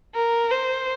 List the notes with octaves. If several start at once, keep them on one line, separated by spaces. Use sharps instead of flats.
A#4
C5